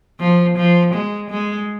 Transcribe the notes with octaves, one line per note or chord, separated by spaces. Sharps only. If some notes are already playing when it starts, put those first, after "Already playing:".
F3
F3
G#3
G#3